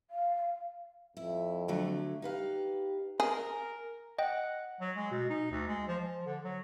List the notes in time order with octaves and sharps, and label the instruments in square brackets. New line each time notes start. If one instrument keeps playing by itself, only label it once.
[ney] F5
[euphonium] F2 [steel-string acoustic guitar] E4
[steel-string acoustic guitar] D3 F#3 A3
[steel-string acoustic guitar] D#4 B4 F5 [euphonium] G4
[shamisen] G#4 [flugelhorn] A#4
[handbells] D#5 G5 [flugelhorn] F#5
[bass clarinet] F#3
G#3
B2
D#4
D2
G#3
F3
F3
D3
F#3